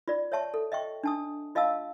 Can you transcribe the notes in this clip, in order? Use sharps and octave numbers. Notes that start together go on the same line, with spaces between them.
F4 D5
C#5 E5 A5 C#6
A4
D#5 E5 G5 C#6
D4 A5 D#6
F4 D#5 F5 A5 E6